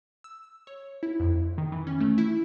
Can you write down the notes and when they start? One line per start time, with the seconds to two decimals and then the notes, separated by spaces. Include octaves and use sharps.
0.24 E6
0.67 C#5
1.03 E4
1.20 F2
1.58 D#3
1.72 E3
1.87 C#4
2.00 A3
2.18 E4